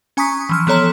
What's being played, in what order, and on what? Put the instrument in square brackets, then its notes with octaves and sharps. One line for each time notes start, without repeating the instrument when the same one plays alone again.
[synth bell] C#4 G#5 A#5 C#6 D#6 B6
E3 F3 F6
F3 B3 A4 C#5 A#5 E7